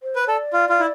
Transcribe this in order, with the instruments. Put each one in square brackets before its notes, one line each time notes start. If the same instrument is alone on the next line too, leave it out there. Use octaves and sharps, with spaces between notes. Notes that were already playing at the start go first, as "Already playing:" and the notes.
[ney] C5
[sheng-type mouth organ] B4
[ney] C5
[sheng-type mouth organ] A4 [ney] D5
[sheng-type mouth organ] F4
F4
E4